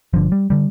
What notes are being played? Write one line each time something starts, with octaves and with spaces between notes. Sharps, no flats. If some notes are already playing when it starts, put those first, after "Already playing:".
G1 G2 D3 F3
G3
D3 G3